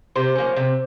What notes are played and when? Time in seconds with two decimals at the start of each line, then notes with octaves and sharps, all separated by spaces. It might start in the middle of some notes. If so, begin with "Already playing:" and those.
0.16 C3 C5
0.36 F3 A#3 C#4
0.57 C3